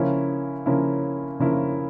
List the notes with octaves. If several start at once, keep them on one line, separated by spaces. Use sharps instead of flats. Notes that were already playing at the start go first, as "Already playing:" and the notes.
Already playing: C#3 F3 A#3 C#4 E4
C#3 F3 A#3 C#4 E4
C#3 F3 A#3 C#4 E4